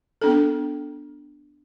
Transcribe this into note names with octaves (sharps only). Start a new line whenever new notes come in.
B3 D4 A4